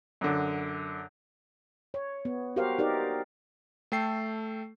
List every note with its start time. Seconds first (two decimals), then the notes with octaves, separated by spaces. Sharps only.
0.21 F#2 D3
1.94 C#5
2.25 B3
2.56 F#4 G4 A#4 C5 F5
2.79 D#4 G4 A#4 D5
3.92 A3 A4 G5 C7